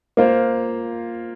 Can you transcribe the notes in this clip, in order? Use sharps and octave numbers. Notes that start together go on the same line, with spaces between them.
A#3 F4 C5